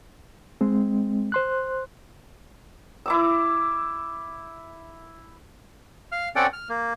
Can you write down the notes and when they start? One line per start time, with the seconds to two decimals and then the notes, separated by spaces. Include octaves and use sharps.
0.61 G#3 C4
1.32 C5 C6 F#6
3.06 E4 D6 E6
6.12 F5 F6
6.36 C4 C#4 A4 D5 F#5 G5
6.53 F6
6.69 A#3